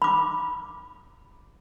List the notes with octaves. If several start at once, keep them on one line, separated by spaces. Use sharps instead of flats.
B5 D6